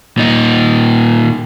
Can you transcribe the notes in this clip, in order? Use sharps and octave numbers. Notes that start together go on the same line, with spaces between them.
A#2 D#4